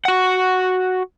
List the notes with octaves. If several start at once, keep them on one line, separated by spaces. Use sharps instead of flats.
F#4 F#5